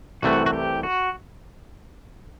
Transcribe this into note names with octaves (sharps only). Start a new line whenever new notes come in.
C2 C3 E3 A3 F#4
F#4
G4
F#4